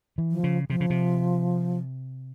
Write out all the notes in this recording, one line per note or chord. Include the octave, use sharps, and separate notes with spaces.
E3
F3
C#3
C3 F3
C#3
C3